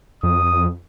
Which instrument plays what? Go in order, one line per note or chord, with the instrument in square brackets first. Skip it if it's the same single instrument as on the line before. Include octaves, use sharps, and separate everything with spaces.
[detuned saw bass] F2 [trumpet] D#6